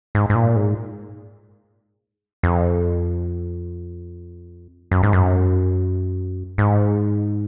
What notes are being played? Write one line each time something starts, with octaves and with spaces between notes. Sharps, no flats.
G#2
G#2
A#2
G#2
F2
F#2
G#2
F#2
G#2